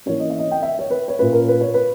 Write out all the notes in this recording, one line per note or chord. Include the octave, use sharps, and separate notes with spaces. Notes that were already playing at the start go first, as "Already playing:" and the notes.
E3 A#3 C#4 C#5
D#5
E5
D#5
G5
E5
C#5
B4
C#5
A#2 A#3 C#4 B4
A#4
B4
C#5
B4